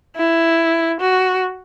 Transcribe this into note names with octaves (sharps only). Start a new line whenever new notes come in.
E4
F#4